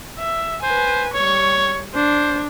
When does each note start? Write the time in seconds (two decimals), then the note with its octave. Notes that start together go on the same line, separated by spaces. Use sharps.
0.18 E5
0.63 B4 C5 G#5
1.14 G3 C#5 C#6
1.95 D4 C5